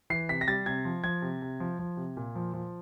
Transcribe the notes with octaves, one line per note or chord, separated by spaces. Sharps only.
E3 C7
C3 B6
A#6
G3 A6
C3 G#6
F3
F3 G#6
C3
C3
F3
F3
C3
A#2
F3
F3